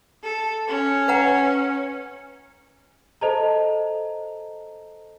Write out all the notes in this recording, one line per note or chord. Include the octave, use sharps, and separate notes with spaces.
A4
C#4
B4 F#5 A#5
A4 C5 D#5 A5 A#5